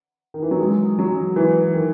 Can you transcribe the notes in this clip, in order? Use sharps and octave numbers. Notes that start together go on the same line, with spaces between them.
D#3
E3
F#3
G#3
F#3
E3
D#3